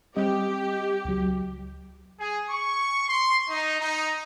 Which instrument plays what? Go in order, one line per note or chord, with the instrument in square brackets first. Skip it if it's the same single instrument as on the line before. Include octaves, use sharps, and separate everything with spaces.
[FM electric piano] G3 C4 D#5 [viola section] G4
[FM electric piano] C#2 F#3
[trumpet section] G#4
C#6
C6
D#4
D#4